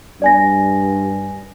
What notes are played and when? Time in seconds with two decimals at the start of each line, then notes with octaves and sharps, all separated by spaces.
0.22 G2 D5 G#5 A#6